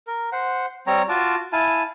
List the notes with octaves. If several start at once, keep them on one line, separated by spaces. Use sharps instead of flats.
A#4
C5 F#5
G3 C4 C#5 A#5
F4 F#4 A5 D6
E4 F5 G#5 A5